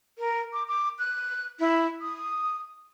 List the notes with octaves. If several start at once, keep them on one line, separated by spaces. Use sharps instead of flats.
A#4
D6
D6
F#6
E4
D#6